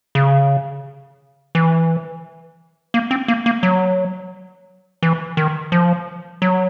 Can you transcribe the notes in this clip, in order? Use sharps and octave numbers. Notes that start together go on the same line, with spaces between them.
C#3
E3
A#3
C4
A#3
A#3
F#3
E3
D#3
F3
F#3